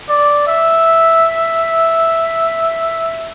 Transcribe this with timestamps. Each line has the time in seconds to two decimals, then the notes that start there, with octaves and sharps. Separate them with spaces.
0.09 D5
0.47 E5